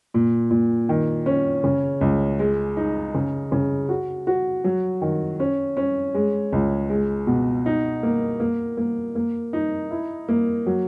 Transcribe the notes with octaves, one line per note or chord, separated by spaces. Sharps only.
A#2
A#2
D#3
C#4
C#3
C#2
G#3
D#4
C#3
C#3
F#4
F#4
F#3
D#3
C#4
C#4
G#3
C#2
G#3
B2
D#4
A#3
A#3
A#3
A#3
D#4
E4
A#3
F#3